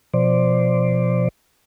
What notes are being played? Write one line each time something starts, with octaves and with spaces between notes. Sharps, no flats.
B2 F3 C5 D5